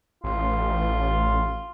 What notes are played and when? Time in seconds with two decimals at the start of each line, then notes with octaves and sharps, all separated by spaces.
0.24 A1 F4